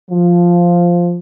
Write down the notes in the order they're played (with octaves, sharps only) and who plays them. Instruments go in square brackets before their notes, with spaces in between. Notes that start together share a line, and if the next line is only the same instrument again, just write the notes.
[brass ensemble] F3